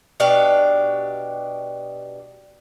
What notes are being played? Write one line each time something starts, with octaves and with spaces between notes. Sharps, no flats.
B2 D4 G4 F5